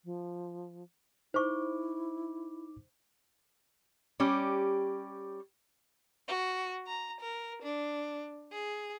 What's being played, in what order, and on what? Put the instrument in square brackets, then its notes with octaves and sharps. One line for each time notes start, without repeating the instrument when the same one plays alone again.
[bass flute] F3
[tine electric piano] D#4 D6 [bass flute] E4 [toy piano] C5 C#6
[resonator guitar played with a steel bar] G3 C#4 G4
[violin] F#4
A#5
A#4
D4
G#4